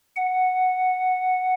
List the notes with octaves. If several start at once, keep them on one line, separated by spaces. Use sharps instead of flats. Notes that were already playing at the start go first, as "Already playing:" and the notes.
F#5